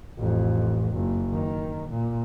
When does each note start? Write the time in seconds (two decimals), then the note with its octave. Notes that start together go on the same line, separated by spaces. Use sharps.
0.18 A1 F2
0.93 F#1
1.33 D#3
1.89 A#2